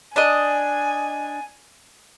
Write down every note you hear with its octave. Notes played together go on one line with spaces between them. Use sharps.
D4 D#5 G#5